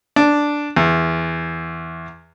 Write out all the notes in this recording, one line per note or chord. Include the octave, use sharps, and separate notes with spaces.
D4
E2